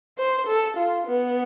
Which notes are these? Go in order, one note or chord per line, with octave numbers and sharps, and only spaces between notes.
C5
A4
F4
B3